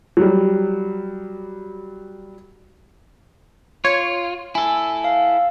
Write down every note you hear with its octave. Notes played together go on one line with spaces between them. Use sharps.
F#3 G3
F4 C#5 C#6
E4 A4 G#5
F5